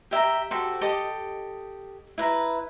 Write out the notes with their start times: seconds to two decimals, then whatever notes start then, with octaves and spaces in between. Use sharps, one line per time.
0.11 G4 E5 G5 A#5
0.51 F#4 G4 A4 C5
0.81 G4 A4 D#5 D#6
2.18 E4 B4 A#5